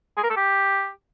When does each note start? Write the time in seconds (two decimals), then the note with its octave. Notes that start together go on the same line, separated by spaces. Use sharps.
0.17 G#4
0.24 A#4
0.30 A4
0.36 G4